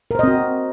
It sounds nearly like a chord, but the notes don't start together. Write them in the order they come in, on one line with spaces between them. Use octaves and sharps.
A#4 C5 D#5 C4 F#4